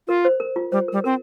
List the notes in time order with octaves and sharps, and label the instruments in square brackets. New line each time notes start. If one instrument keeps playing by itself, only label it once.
[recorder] F4 [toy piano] A#4
[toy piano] C5
A#4
F4
[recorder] G3 [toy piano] C5
[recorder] G3 [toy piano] A#4
[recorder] C4 [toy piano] A#4